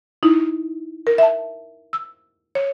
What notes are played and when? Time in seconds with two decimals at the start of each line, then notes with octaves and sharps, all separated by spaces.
0.23 D#4 E4
1.07 A#4
1.18 E5 A5
1.93 E6
2.55 C#5